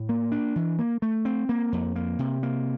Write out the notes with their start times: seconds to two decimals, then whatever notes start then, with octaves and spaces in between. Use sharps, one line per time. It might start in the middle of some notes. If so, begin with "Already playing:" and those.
Already playing: A2
0.09 A#3
0.32 D4
0.56 E3
0.79 A#3
1.02 A3
1.25 C4
1.49 A#3
1.72 F2
1.96 A#3
2.19 C3
2.43 A#3